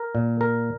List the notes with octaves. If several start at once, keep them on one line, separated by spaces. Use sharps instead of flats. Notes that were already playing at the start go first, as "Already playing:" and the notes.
Already playing: A#4
A#2
A#4